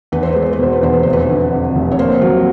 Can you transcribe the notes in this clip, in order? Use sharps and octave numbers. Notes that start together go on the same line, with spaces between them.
E2 B4
C5
G#3 B4
C5
B4
B2 C5
B4
E2 C5
B4
F1 C5
B4
D3
F2
F1
C#5
A#3 C5
F#3